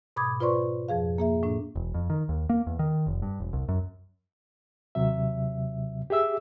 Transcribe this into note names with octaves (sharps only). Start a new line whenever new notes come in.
G#2 B2 B5 D6 D#6 G#6
F4 B4 C5 D5 C6 C#6
F2 F3 G#4 F5
A#3 G#4 E5
A2 D4
E1
F2
D#3
D#2
A#3
E2
D#3
F1
G2
E1
C2
F#2
D#2 C3 F#3 E5
G4 G#4 E5 E6